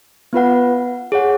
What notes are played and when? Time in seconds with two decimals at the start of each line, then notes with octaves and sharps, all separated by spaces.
0.33 B3 F4 B4 F#5
1.12 G#4 C#5 F#5